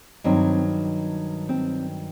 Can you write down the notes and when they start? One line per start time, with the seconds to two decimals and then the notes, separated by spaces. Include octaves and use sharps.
0.24 G2 D#3 F#3 C4
1.49 C4